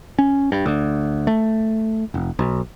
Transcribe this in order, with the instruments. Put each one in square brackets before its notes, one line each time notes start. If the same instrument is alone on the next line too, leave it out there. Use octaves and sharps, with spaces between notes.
[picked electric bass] C#4
G2
D2
A3
F1
B1